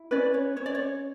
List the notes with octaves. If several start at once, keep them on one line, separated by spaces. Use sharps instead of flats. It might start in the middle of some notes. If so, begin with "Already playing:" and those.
Already playing: E4
C#4 B4 D5
C#5
C#4 C#5
D5
C#5